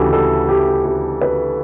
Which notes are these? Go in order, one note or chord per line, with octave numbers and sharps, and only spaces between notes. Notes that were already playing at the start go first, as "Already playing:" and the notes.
Already playing: D2 C#3 E3 F#4 G4 A4
A4
G4
G4
B4